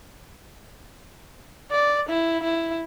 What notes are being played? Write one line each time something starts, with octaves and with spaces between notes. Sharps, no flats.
D5
E4
E4